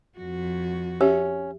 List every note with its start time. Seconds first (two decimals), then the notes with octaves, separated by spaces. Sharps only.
0.18 F2 F#4
1.01 C#4 G4 E5